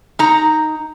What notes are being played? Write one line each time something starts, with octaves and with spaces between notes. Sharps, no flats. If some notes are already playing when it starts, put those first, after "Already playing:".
D#4 A#5